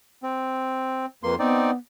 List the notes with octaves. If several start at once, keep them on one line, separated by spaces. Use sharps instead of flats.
C4
F2 A#3 B4 C6
B3 C4 D#4 D5